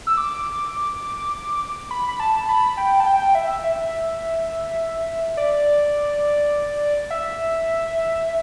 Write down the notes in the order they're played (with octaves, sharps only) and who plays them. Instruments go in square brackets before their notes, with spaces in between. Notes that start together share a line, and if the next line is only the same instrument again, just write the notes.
[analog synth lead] E6
D6
B5
B5
A5
B5
G5
A5
G5
E5
E5
D5
E5